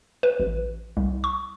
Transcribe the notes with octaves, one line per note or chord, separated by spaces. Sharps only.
B4
A1
C2
C#6